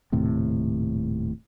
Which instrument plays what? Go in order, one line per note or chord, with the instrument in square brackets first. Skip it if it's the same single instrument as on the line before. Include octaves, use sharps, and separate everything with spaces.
[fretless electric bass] D#1 D#2 A2 C3